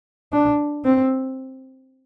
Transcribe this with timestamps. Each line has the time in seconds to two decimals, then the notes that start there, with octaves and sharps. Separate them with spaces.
0.32 D4
0.85 C4